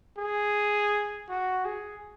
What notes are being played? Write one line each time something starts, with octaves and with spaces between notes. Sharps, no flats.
G#4
F#4
G#4